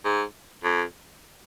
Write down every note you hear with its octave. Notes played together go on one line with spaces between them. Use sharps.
G#2
F2